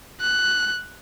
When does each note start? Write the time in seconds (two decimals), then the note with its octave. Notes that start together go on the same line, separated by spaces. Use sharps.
0.21 F#6